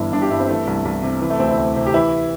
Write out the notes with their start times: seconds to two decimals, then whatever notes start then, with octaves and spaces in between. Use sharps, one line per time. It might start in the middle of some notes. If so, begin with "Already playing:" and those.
Already playing: G1 G2 E3 E4
0.12 G1 D4
0.22 G4
0.31 G2 E4
0.40 C4
0.48 E3 A3
0.67 C2
0.85 C2
1.03 C3
1.22 E3
1.30 A3
1.39 D2 C4
1.49 E4
1.58 D2
1.75 C3
1.86 G4
1.94 E3 E4